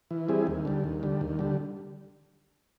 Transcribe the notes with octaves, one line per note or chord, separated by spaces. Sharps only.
E3
G3 C4 E4 G#4
D#2
D3 G3
D#2
D3 G3
D#2
D3 G3